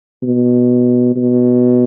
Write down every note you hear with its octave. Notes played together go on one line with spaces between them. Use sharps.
B2
B2